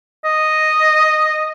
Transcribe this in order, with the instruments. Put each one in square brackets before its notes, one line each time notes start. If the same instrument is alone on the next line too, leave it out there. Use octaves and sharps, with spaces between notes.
[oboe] D#5